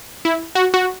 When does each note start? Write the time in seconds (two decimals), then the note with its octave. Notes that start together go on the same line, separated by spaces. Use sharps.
0.25 E4
0.55 F#4
0.74 F#4